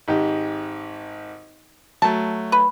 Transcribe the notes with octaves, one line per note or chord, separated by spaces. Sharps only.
G#1 G#2 G4
F#3 A3 A5
B4